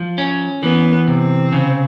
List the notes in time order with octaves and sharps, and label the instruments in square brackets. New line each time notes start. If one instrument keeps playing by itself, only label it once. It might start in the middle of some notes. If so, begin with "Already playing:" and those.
Already playing: [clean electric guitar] F3
C#4
[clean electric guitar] E3 [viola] B3
[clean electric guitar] C3 [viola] C4
[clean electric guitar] C#3